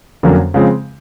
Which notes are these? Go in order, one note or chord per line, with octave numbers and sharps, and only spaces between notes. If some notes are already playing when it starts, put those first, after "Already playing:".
F2 D3 F#3 A#3 C#4
C#3 F3 G#3 C4